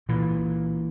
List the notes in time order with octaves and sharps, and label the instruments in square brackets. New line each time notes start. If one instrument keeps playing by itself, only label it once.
[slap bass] A#2 E3